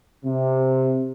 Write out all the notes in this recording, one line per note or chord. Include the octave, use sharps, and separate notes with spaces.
C3